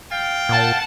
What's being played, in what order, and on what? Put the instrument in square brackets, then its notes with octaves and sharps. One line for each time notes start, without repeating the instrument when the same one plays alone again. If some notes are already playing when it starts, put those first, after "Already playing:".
[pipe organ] F5 A6 [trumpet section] G5
[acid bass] A#2 [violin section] F#5 A5